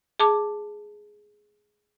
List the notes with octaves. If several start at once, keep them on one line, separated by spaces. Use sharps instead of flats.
G#4 A5 D6